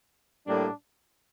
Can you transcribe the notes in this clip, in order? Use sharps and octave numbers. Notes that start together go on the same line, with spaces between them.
A2 G3 A#3 D4